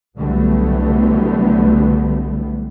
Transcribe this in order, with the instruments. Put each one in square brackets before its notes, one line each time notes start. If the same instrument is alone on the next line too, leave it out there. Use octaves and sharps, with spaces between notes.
[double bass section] C2 D3 F#3 G3 A3 B3